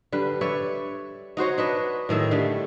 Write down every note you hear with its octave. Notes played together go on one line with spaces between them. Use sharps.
D3 G3 B4
B4 C#5 D5 E5
D#4 F#4 C5 C#5
D4 B4 D#5
A2 D#3 G#3 E5
D3 G3 A3